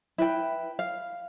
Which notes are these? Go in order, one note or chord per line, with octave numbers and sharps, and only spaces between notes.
E4 B4 G5
F5